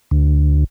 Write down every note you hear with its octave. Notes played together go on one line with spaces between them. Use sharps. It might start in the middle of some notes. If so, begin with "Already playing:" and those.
D2